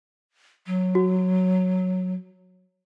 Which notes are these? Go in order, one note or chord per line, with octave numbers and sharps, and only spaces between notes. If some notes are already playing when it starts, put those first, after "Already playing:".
F#3
F#4